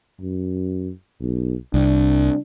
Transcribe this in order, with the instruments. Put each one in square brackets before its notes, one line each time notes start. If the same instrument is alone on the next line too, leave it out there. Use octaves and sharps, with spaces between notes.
[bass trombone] F#2
B1
[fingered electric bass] C2 [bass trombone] D4